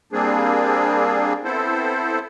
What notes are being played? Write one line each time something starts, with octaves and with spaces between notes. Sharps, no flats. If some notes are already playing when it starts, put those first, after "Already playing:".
G3 A#3 C4 D4 G#4
B3 C4 E4 A4 C5